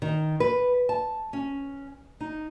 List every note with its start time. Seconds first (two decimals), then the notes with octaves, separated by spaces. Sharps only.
0.02 D#3
0.40 B4
0.89 A5
1.33 C#4
2.21 D#4